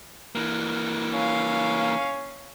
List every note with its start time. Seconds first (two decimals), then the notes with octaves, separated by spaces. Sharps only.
0.35 E3 A#3
1.14 C#4 F5